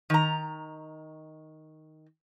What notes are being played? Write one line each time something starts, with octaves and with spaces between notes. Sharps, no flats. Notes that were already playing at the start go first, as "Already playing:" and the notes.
D#3 A#5